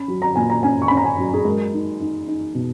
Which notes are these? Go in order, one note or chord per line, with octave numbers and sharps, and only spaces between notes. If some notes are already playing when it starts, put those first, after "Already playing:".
Already playing: C#4 B5
F#3
A#5
A#2 G#5
A#5
C#4 G#5
C#6
B5
C#4
A#5
G#5
F#3
G#4
G#3 A#4
D#4
D#4
D#4
B2